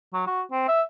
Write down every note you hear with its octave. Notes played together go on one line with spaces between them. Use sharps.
F#3
F#4
C4
E5